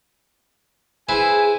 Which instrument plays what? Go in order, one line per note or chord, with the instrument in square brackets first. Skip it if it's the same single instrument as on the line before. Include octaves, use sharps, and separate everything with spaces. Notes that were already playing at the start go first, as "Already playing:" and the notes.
[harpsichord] E4 B4 C5 [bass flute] G#4 [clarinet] G#5